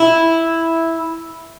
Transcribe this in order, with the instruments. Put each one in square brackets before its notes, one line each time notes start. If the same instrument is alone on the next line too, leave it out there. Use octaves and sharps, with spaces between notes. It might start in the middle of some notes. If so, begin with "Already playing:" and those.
Already playing: [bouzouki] E4